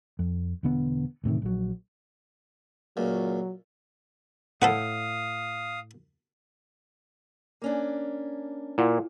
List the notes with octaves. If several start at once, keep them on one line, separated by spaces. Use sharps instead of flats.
F2
E1 D3 B3
E1 A2 C3 D#3
A#1 F#3
C#2 A#2 F#3
A2 A4 B4 F5 F#5 D#6
A#3 C#4 D4
A#2 E4 F4 F#5